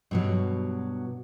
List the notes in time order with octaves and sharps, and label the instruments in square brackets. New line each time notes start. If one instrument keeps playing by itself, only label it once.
[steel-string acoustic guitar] G2 B2 F#3